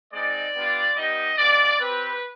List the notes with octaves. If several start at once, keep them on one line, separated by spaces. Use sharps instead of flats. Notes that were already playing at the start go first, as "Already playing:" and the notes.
G#3 C4 D#4 D5
G3 B3 D4 F4
G3 B3 D#4 G4 D#5
G#3 B3 F4 D5
C4 G4 B4